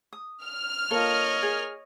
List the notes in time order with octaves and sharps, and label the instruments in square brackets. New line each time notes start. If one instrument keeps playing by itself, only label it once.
[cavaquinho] D#6
[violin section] F6
[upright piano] A#3 F4 [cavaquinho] A4 [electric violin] C#5 D#5
[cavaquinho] G#4